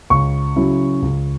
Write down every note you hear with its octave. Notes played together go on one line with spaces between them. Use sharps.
C#2 C#6
C#3 F#3 C#4 E4
C#2